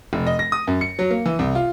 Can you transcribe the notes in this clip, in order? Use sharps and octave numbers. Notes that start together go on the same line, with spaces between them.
F1
D#5
A#6
D#6
F#2
C#7
F#3
A#3
E3
C2
F4